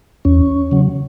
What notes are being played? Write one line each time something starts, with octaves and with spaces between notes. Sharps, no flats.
E2 C#4
C#3 F#3